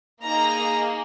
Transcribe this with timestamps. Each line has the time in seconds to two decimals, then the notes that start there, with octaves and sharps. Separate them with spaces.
0.24 A#3 D#4 G#4 A#5